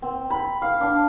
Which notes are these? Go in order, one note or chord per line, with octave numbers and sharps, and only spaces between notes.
C4
B5
F5
D4